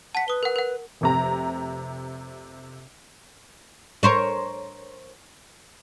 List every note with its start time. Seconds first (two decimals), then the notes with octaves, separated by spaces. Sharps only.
0.15 F#5 A5 B6
0.28 B4 D#6 G7
0.43 A#4 F#5
0.56 A#4 F#5
1.01 F1 C3 A#5
4.03 A#4 C5 C#5